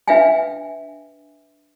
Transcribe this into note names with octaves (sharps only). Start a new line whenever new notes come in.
D4 B4 E5 F5 G5 G#5